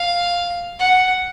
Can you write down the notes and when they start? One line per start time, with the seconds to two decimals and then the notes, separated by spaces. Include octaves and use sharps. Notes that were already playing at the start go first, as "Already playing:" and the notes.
Already playing: F5
0.79 F#5